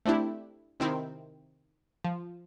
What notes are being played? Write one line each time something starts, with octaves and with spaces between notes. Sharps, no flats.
A3 C4 D4 E4 G4
C3 D#3 C4 E4
F3